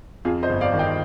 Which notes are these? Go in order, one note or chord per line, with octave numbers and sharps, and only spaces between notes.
F2 F4 G#4
C5 D#5
G1
D5 F5
D#3
D#5 G5